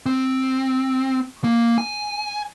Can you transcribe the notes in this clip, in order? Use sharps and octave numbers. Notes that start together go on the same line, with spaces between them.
C4
A#3
G#5